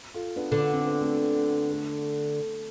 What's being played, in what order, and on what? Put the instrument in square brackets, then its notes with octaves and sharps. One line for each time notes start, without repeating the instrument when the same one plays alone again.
[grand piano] F4 A4
B3 D4
[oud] D3
[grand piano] D4
C4
B3
A3 C4
A3